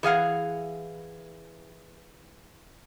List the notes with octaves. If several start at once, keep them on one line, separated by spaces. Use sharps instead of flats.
E3 G#4 F5 F#5